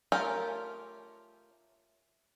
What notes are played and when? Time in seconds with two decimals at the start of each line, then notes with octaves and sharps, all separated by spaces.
0.12 A3 C#4 F4 G4 A#4